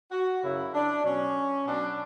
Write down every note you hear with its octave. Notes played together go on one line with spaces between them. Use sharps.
F#4
F#2 C#3 F#3 E4
D4
B2 F#3 C#4
B2 F#3 D4